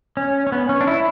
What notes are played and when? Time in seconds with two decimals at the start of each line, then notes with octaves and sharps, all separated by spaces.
0.17 C#4
0.47 C#4
0.52 B3
0.69 C#4
0.81 D4
0.87 E4